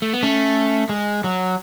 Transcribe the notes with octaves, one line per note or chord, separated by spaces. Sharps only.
A3
B3
A3 C#4
G#3
F#3